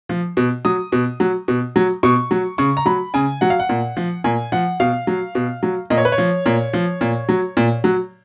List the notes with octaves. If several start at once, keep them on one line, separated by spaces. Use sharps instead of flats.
F3
B2
F#3 D#6
B2
F#3
B2
F#3
B2 C#6
F#3
C#3 C#6
A#5
F#3 B5
C#3 G#5
F#3 F#5
F5
F#5
A#2
F3
A#2 G#5
F3 F#5
B2 F5
F#3
B2
F#3
A#2 D#5
C#5
B4
C#5
F3
A#2
F3
A#2
F#3
A#2
F#3